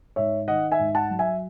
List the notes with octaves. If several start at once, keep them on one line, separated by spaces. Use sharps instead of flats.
G#2 C#5 E5
D#3 D#5 F#5
E5 G#5
G#2
F#5 A5
F#3
E5 G#5